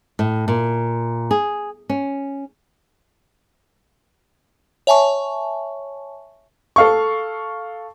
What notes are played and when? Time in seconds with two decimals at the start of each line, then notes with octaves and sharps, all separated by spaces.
0.19 A2
0.48 A#2
1.31 G#4
1.89 C#4
4.87 C#5 E5 G#5 A5 C#6
6.76 A4 F5 C#6